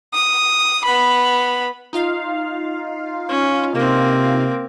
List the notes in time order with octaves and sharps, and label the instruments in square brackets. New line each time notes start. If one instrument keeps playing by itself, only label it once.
[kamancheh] D#6
B3 B5
[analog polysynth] D#4 F4 F5
[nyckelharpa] C#4
[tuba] C3 [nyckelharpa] A#3 C4